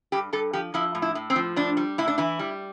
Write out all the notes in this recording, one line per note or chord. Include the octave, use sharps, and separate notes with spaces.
G2 G4
G2 A4
F3 G4
F3 E4
A2
E4
A2
C4
F3
A2 D4
G3
A2 E4
D4
E3 E4
G3